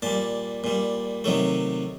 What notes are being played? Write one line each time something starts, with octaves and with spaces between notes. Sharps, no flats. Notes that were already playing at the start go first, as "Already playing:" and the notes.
A#2 G3 A5
A#2 G3
C3 D#3 F#3 A3